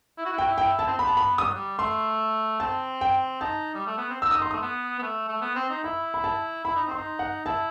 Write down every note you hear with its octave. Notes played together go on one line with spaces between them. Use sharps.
E4
F#4
E4
F#4 G5
E4
E4 G5
A5
C4
B3 B5
A5
B5
G3 D#6
F#3
G3
A3 C6
C4 A5
G5
D#4 A5
G3
A3
B3
C4
D#4 E6
D#6
C6
A3 D#6
B3
B3
A3
A3
B3
C4
D#4
E4 B5
B5
A5
E4 B5
D#4
C4 C6
D#4
F#5
E4 A5